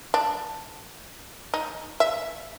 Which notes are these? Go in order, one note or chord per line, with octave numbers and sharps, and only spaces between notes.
D4
D#4
E5